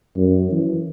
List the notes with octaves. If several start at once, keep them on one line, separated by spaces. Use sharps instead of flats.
F#2
E3